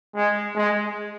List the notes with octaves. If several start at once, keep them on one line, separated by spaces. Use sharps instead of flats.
G#3
G#3